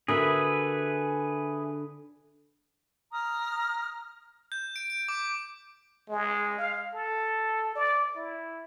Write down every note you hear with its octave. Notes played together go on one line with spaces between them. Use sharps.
D3 F#4 G#4 A#4 B4 E5
A#5 D#6 F6
G6
D7
D7
D6
G#3
F5
A4
D5
E4